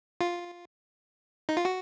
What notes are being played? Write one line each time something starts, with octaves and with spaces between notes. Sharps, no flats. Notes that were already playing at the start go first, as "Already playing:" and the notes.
F4
D#4
F4
F#4